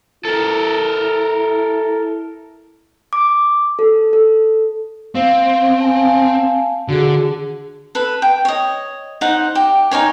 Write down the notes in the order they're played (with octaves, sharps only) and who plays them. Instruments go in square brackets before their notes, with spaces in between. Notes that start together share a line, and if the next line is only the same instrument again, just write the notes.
[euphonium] E4 [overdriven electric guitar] A4 A#4
[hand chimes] D6
A4
A4
[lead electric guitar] C4 [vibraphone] F5
[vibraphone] F5 G#5 A5
[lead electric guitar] D3 [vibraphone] F#4 G#4
[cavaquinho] A4 B4
G5
C#5 D#5
D#4 C5 F#5
G4
D#4 A#4 C#5 G#5